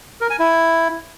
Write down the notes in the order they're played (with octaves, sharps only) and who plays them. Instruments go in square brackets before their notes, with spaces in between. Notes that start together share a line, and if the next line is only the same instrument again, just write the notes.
[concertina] A#4
G#5
E4